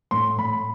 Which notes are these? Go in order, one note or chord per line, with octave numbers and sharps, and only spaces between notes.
A2 C6
A2 B5